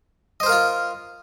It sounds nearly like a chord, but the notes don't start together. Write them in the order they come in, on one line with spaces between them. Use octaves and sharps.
D#5 C5 A#4 F5 F4